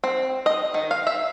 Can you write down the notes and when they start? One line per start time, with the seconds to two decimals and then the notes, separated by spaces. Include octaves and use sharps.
0.04 C4
0.46 D#5
0.74 D#3
0.91 F5
1.07 E5